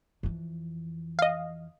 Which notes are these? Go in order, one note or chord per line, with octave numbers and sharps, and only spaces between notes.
F2 E3
D#5 F5